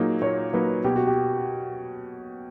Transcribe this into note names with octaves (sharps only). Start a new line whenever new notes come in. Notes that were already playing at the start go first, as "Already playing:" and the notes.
Already playing: A#2 F#3 A#3 D#4 G#4
A#2 C#5
F#3 A#3 D#4 B4
B2 G4
F#4
G4